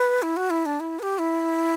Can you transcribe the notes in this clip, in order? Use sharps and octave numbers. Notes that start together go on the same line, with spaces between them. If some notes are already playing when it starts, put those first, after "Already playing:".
Already playing: B4
E4
F#4
E4
D4
E4
B4
G4
E4